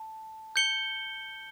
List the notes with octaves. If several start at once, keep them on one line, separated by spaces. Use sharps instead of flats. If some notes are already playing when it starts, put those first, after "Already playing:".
Already playing: A5
G6 C#7 G7